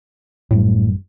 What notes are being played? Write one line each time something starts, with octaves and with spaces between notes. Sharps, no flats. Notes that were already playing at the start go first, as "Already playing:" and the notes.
A1 F#2 A2 G3